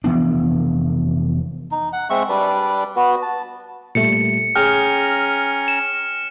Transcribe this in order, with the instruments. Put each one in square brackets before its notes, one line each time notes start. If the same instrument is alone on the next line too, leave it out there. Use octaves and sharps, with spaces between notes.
[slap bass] F1 E3 B3 D4
[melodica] D#4
F#5
G#3 C4 E5 C#6
G3 D4 B4
B3 F#4 B4
A5
[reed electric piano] A#2 G3 A3 [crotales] C#7
[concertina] C#4 G#5 A#5 [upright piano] G#4 [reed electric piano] G5 [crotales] F6
[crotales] E7